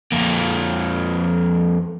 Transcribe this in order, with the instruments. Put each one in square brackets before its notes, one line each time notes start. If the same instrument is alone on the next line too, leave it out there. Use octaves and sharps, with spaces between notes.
[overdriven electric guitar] F2 A#3